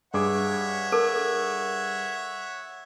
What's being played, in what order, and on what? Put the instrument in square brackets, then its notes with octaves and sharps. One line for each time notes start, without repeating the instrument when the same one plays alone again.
[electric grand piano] G2 G#4 D6 [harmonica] C#5 E5 F#5
[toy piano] A4 A#4